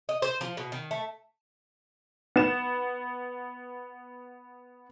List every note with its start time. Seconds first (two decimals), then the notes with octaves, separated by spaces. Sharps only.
0.09 D#5
0.22 C5
0.41 F3
0.57 B2
0.72 D#3
0.91 A3
2.36 B3 E7